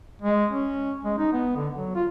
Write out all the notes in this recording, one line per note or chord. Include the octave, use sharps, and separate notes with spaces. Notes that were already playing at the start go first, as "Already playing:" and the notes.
G#3
C#4
G#3
D#4
B3
D3
F#3
F4